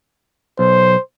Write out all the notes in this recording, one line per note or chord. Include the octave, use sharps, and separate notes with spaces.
B1 C5